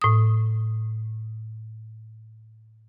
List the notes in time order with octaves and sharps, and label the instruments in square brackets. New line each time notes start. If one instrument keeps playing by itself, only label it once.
[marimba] A2 D#6